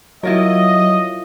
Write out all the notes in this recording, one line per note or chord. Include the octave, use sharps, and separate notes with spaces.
F#3 E4 F4 A#4 D#5